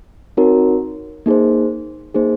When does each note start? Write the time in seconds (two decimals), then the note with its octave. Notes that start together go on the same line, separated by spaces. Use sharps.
0.37 C4 D#4 F#4 A#4 C#5
1.26 A#3 D#4 G#4 C5
2.15 A#3 D#4 G#4 C5